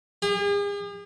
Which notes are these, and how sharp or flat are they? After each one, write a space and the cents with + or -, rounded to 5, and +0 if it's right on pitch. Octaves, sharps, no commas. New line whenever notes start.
G#4 -45